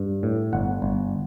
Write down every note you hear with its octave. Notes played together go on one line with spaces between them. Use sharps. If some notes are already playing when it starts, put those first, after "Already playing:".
Already playing: G2
A2
G1 F#5
G1